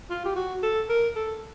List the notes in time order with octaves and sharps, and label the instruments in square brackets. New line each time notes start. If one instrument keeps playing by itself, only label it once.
[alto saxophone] F4
G4
F#4
A4
A#4
A4